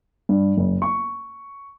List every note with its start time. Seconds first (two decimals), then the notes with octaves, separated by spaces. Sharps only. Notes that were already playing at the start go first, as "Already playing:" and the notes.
0.29 G2
0.57 F#1
0.82 C#6